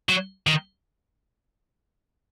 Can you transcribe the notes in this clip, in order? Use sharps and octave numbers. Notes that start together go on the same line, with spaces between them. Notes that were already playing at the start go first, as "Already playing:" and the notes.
F#3
D#3